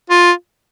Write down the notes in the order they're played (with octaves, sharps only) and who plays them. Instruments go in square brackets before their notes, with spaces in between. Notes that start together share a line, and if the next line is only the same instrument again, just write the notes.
[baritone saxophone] F4